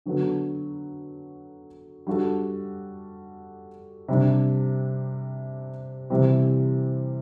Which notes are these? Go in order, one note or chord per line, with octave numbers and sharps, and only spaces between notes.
D3 F#3 B3 F#4 A4
G3 D4 F#4 A4
C3 G3 D4
C3 E3 G3 C4 G4